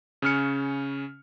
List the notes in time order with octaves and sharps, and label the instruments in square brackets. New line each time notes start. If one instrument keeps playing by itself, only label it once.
[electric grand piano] C#3 C#4 F6 C#7